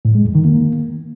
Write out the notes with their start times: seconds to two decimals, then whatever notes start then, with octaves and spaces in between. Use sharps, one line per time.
0.05 A2
0.15 G#3
0.25 F2
0.35 D#3
0.45 A#3